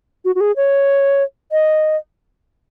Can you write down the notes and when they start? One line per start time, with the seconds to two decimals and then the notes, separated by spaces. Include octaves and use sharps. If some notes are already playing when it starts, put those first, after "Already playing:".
0.25 F#4
0.35 F#4
0.41 G#4
0.56 C#5
1.52 D#5